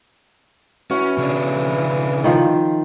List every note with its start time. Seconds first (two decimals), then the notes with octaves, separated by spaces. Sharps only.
0.91 E3 C#4 F#4
1.18 C#3 C#4 D4
2.24 D#3 F3